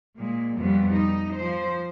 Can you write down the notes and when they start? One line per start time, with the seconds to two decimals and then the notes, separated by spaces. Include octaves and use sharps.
0.16 A#2 G#3
0.58 F2 B2 G3 B3
0.93 D#4
1.35 F3 C5